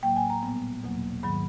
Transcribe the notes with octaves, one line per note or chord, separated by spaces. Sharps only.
A2 F#3 A#3 G5
G#5
A#5
A#2 G3 B3
E2 B2 F#3 A#3
G#2 D#3 F#3 B5